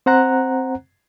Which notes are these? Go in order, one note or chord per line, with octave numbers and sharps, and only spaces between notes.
C4 C5 F#5 A#5 F#6